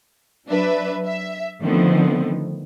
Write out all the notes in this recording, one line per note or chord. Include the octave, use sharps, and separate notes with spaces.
F#3 D4 B4 E5
E5
D3 D#3 F3 A3 B3 C4